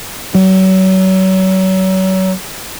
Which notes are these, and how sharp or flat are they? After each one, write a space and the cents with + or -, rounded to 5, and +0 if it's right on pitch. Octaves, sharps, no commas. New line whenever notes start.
F#3 +35